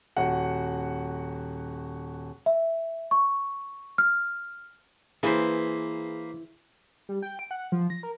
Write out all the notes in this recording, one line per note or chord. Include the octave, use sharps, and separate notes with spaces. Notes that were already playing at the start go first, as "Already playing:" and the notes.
D#1 F#4 F#5
E5
C#6
F6
E3 A#3 G#4 B4 C5
G3
G5
D7
F#5
F3
A#6
A#4